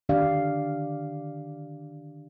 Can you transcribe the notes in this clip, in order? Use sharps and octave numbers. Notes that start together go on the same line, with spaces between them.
D3 D#3 D4 G4 D5 F5